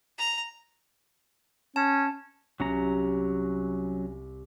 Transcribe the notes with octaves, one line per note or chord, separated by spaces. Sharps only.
A#5
C#4 A5
C2 F#3 C#4 A#5